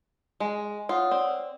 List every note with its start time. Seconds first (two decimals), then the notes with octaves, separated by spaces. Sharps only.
0.40 G#3
0.89 F4 C#5 F#5 D#6
1.11 C4 D5